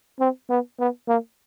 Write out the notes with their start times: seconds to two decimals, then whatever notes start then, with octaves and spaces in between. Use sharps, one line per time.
0.20 C4
0.50 B3
0.79 B3
1.08 A#3